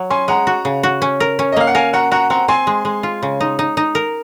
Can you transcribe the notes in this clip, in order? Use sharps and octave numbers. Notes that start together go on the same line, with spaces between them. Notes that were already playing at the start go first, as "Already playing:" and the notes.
Already playing: F#3
C#4 G#5 C6
G#3 F#5 A#5
F#4
C#3
F#4
C#4
A#4
C#4
D#5
A#3 F5
F#5
A#4 F5 G#5
F#4 F#5 A#5
F#4 F#5 A#5
C4 F#5 A#5
C4 G#5 C6
G#3
G#3
F4
C#3
D#4
D#4
D#4
A#4